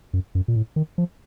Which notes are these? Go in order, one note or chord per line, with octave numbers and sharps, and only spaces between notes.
F#2
F#2
A#2
A2
D#3
F3